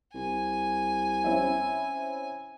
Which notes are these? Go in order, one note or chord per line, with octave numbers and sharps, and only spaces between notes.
C2 G#5
C4 C#4 E4